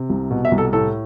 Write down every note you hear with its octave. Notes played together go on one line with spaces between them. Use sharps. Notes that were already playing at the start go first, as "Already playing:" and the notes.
Already playing: C3
C2
B2
E5
C2
A4
A2 A4